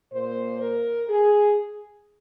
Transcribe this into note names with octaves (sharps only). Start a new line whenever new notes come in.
A#2 A#3 C5
A#4
G#4